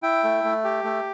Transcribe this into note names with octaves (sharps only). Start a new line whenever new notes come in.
E4 G5
A3
A3
G4
A3